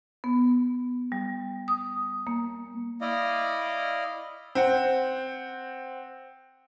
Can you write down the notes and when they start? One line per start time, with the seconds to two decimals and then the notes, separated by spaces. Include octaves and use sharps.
0.24 B3
1.12 G3
1.68 D#6
2.27 A#3
3.01 E4 D5 D#5 F5
4.55 C4 F#5